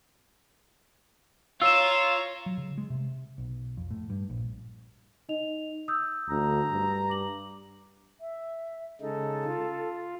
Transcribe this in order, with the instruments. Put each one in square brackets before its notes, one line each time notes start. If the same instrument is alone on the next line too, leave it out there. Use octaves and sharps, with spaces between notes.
[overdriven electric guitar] F4 [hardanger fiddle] C#5 A#5 [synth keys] E6 E7
[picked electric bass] F#3
C#3
G#3
C3
B1
F2
A2
G2
A#1
[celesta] D#4 D#5 F7
D#6 E6 G6
[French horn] D2 [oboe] A#5
[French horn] G2
[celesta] D6 F#7
[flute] E5
[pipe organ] C#3 G#3 D#4 [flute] A4
[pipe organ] F4